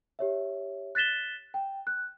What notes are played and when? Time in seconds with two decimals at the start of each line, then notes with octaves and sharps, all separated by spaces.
0.19 G4 C#5 E5
0.95 F#6 A6 B6 E7 G7
1.54 G5
1.87 F#6